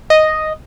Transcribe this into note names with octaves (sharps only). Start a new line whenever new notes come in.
D#5